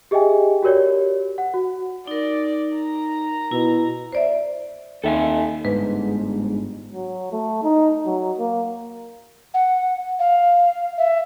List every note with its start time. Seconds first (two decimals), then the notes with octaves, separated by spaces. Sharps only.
0.11 G4 G#4 D#5 E5 G5 G#5
0.63 F#4 G4 A#4 C#5 D5
1.38 F#5
1.54 F#4
2.08 D#4 A#4 D5
2.76 A#5
3.51 B2 E4
4.12 C5 D5 E5
5.04 D#2 A4 E5 G5 G#5
5.65 G1 G#2 B4
6.92 F#3
7.33 A3
7.63 D#4
8.06 F#3
8.39 A#3
9.54 F#5
10.19 F5
10.98 E5